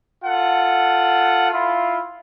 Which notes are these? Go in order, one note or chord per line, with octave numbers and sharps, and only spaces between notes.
F4 A4 F#5
E4 F4